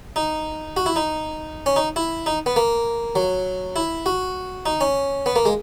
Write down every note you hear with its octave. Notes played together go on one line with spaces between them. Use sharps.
D#4
F#4
E4
D#4
C#4
D#4
E4
D#4
B3
A#3
F#3
E4
F#4
D#4
C#4
B3
A#3
G#3